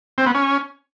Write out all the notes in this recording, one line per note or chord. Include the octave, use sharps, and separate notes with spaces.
C4
B3
C#4